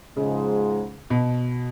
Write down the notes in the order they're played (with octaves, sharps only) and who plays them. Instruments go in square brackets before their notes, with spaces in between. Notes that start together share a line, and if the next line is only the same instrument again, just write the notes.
[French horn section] G#2 F3 G#3 [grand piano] C#3
[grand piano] B2